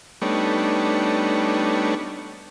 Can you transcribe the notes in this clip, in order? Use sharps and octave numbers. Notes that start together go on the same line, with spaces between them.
G3 A3 B3 D4 D#4 C#5